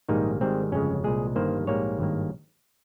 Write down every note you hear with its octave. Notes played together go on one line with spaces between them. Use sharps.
A#1 G#2 D#3 G3 A#3 D#4
G#1 G#2 D#3 G3 C4
G1 F2 C#3 G#3 C#4
C2 A#2 G#3 G#4
G1 G2 D#3 A#3 C5
A#1 G#2 G3 A#3 C#5
G#1 G2 D#3 A#3